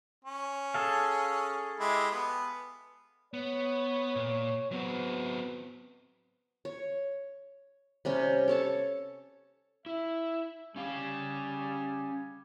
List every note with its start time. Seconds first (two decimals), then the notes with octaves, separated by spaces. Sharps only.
0.25 C#4
0.74 G#4 A4 F5
1.80 G#3 E4 G4
2.11 B3
3.34 B3 C#5
4.16 A#2
4.72 F#3 B3 C4
6.65 C#5
8.05 C3 G3 C#4
8.48 A4 C#5 A5
9.86 E4 E5
10.76 G3 C#4 G4 F5 G#5